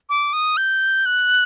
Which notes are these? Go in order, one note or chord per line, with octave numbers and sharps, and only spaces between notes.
D6
D#6
G6
F#6